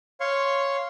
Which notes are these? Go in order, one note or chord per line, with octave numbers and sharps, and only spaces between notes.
C#5 F5 C6 C#6